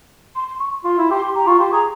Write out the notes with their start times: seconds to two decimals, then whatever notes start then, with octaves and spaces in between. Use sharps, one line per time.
0.36 C6
0.48 C6
0.60 C#6
0.85 F4 C6
0.98 E4
1.10 G4 C6
1.23 G4
1.35 G4 A#5
1.47 F4 C#6
1.60 G4 C6
1.72 G#4 A#5